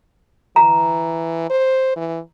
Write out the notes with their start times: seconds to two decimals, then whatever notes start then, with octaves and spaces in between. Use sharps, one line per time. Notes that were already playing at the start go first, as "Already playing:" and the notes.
0.56 E3 A#5
1.50 C5
1.96 E3